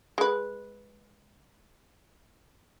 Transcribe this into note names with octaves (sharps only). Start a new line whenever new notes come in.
G#3 B4